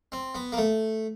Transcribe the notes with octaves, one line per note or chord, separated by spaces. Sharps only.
C4
B3
A#3
A3